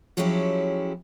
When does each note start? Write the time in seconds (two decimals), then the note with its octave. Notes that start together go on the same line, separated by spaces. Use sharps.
0.17 F3 F#3 G#3 C#4 E4 G4